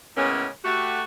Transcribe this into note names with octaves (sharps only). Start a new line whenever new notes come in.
A2 C#3 G#3 A#3 B3 C#4
A3 F#4 G4